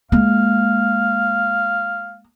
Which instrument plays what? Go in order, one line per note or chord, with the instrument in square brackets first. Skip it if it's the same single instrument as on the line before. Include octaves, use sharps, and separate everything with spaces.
[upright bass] G#3 A#3 [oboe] F5